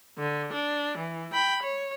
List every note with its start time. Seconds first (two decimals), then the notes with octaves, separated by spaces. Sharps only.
0.18 D3
0.53 D4
0.98 E3
1.33 G5 B5
1.62 C#5